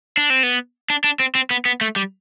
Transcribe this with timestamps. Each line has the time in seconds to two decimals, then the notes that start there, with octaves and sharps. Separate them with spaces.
0.17 D4
0.30 C4
0.43 B3
0.90 D4
1.04 D4
1.20 C4
1.35 C4
1.51 B3
1.65 B3
1.81 A3
1.96 G3